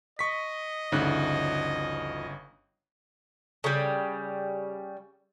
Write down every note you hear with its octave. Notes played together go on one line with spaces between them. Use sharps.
D#5 C#6 B6
G1 D2 C#3 F3 D#4 F#6
C#3 G3